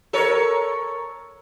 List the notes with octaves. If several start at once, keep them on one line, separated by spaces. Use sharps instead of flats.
A4 A#4 C#5